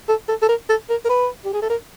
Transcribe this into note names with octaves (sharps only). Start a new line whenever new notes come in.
A4
A4
A4
A#4
A4
A#4
A#4
B4
G4
G#4
A4
A#4